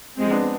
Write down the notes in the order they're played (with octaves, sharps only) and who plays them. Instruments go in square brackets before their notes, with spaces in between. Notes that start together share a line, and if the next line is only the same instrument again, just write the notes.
[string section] F3 G#3 C4
[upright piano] B3 D4